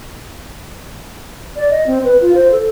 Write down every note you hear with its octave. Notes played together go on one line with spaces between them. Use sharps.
D5
D#5
C4
B4
F4
C5
A4